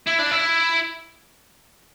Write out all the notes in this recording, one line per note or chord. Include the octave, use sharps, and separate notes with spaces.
E4
D4
E4